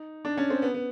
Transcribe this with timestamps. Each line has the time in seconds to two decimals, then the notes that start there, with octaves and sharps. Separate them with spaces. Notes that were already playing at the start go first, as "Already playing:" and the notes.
Already playing: D#4
0.25 D4
0.37 C#4
0.50 C4
0.62 B3
0.74 B3